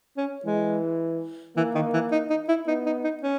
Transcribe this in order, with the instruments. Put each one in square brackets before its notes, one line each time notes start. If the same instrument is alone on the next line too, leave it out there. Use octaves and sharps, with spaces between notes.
[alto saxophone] C#4
[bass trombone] E3 [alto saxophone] G#3
[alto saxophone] E3 [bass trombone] A#3
[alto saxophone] D#3
E3
D#4
D#4
E4
[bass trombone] B3 [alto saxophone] D#4
[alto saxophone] D#4
D#4
C#4